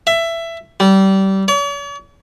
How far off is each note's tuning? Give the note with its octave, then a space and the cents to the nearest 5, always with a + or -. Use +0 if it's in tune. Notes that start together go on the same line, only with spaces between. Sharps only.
E5 +15
G3 -25
C#5 +45